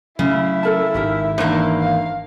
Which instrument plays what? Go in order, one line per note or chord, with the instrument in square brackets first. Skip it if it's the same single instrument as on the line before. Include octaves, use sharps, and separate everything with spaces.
[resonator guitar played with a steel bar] C#3 [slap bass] F#3 A3 C#4 [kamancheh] E4 E5
[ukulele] A4 A#4 A5
[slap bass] G#1 [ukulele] D#4 G4 A#4
[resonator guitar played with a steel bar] E2 A#3 [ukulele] D4 D#4 C5
[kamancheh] F5